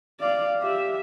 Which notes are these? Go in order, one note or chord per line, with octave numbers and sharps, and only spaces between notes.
D5 F5
G4 E5